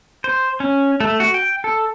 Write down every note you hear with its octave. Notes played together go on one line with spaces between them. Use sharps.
C5
C#4
A3
F#4
G5
A4